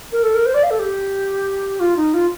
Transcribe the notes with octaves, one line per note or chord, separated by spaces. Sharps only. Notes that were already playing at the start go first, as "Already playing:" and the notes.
A#4
A4
A#4
C5
D5
F5
A4
G4
F4
D#4
F4